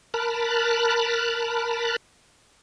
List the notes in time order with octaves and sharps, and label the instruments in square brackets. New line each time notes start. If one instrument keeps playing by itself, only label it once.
[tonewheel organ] A#4 A5 B5 F6 F#6